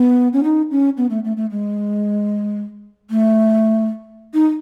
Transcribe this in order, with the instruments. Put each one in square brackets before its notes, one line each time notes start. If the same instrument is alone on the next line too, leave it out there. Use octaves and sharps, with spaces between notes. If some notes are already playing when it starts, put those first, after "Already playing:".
Already playing: [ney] B3
C#4
D#4
C#4
B3
A3
A3
A3
G#3
A3
D#4